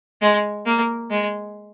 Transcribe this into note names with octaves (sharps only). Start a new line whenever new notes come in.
G#3
A#3
G#3